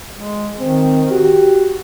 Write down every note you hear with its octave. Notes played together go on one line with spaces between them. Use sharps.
G#3
D#3 C4
F#4 G4